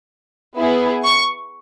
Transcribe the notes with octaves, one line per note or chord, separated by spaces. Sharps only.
B3 E4 G#4
C#6